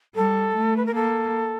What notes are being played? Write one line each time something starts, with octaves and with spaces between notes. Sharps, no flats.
G3 A4
A3
B4
A#4
A#3 A4